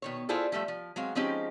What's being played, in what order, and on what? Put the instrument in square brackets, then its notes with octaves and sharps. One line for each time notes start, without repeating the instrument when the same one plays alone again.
[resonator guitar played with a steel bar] B2 D#3 C#5
E4 F4 G#4 A4 C5 D5
F3 G3 A3 E5
F3
F#3 G#3 C4 F5
F3 G#3 C4 C#4 D#4 G4